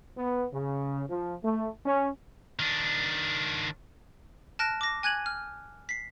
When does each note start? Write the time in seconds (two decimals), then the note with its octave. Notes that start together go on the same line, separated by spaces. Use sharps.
0.17 B3
0.53 C#3
1.08 F3
1.43 A3
1.85 C#4
2.59 D#3 D4
4.59 A5 F6 F#6 A#6 D7
4.81 D6 A#6
5.03 G#5 F#6 G#6 D#7 F#7
5.26 F6
5.89 B6 C7